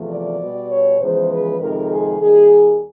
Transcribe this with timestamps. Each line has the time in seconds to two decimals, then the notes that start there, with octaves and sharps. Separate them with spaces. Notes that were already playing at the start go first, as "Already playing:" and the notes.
Already playing: E2 C3 F3 A3
0.09 D5
0.39 B2 G3
0.70 C#5
0.99 E2 C#3 F3 G#3 C5
1.30 B4
1.59 F2 C3 D#3 G#3 A#4
1.90 G#4
2.20 D#2 D#3 G3 G#4